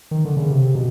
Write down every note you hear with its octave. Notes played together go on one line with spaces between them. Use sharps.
D#3
D3
C#3
C3
B2